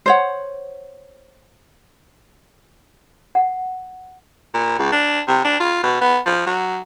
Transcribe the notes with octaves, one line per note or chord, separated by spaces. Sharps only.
C5 C#5 F#5
F#5
A#2
C#2
D4
C3
D4
F4
B2
B3
F3
F#3